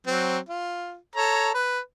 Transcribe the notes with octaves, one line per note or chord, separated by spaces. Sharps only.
F#3 C4
F4
A4 C#5 A#5
B4